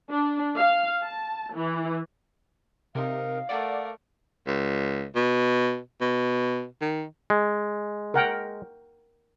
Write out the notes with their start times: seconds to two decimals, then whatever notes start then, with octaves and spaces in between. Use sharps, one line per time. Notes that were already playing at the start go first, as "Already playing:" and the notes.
0.10 D4
0.56 F5
1.04 A5
1.55 E3
2.95 C3 D#4 A#4 F5
3.49 A3 A#4 D5 F#5
4.47 C#2
5.15 B2
6.01 B2
6.81 D#3
7.30 G#3
8.14 A#4 F#5 G5